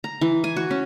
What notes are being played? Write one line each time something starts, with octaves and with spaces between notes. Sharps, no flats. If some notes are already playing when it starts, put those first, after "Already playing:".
A#5
E3
G#5
F#4
C#4